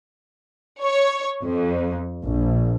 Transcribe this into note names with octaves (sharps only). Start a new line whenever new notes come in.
C#5
F2
A#1